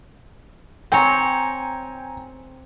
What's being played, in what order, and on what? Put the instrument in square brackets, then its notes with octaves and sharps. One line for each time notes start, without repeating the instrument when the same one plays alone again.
[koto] C4 C#5 [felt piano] G5 G#5 A#5